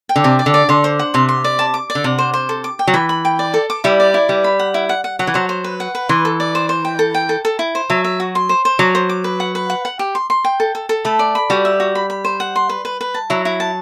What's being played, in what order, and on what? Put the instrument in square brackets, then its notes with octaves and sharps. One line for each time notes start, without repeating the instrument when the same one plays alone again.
[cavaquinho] G5
[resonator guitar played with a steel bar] D3
[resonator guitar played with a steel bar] C3 [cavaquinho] D5
[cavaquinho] D5
[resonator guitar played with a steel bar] D3
[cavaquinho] D5
[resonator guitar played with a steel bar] D3 [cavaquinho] C6
[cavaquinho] C5
F#5
[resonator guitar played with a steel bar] C3 [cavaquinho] C6
[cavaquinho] C6
D5
A5
D6
D5
[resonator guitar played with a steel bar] D3
[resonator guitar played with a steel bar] C3 [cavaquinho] F#5
[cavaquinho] C5
C5
A4
D6
G5
[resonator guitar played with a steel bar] F#3
[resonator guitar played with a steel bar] E3 [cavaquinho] B5
[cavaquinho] B5
G5
D5
A4
D6
[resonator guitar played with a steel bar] G3 [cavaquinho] E4
[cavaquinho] D5
E4
[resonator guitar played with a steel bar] G3 [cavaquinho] B4
[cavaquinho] B5
F#5
E4
F#5
F#5
[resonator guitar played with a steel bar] F#3 [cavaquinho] F#5
[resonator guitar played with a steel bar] E3
[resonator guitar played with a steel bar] F#3 [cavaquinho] C5
[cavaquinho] C5
B4
F#5
B4
[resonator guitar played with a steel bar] E3 [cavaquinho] C6
[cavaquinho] A4
D5
C5
C5
G5
A4
G5
A4
A4
E4
C5
[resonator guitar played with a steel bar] F#3 [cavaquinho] E5
[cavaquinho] E5
F#4
C6
C5
C5
[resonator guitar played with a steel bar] F#3 [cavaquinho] D6
[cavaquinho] C5
D6
B4
F#5
B4
F#5
F#5
G4
C6
C6
G5
A4
A4
A4
[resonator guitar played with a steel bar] A3 [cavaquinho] B5
[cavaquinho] D5
B5
[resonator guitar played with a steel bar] G3 [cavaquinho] F#4
[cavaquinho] E5
F#4
B5
B5
C5
F#5
C6
B4
B4
B4
A5
[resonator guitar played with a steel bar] F#3 [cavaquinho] E4
[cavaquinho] E4
A5